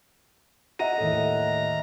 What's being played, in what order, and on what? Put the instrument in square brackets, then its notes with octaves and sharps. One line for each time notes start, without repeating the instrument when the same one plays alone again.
[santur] D#5 E5 F#5 [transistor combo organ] A#5 [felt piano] D#7
[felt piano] D#2 A2 A4